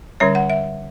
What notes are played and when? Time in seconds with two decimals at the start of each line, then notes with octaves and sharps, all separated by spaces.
0.20 D3 G3 C#4 C#5
0.35 F#5
0.50 E5